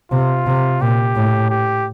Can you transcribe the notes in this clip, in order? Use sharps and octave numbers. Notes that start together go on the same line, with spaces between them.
C3 F4
C3
A#2 G4
A2
G4